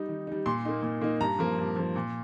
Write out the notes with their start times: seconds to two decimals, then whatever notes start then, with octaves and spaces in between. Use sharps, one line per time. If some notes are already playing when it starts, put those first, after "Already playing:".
Already playing: G3 D#4
0.09 D#3
0.27 G3 D#4
0.46 A#2 C6
0.65 A#3 D#4
0.83 A#2
1.01 A#3 D#4
1.21 G2 A#5
1.39 F3 A#3
1.59 G2
1.76 F3 A#3
1.96 A#2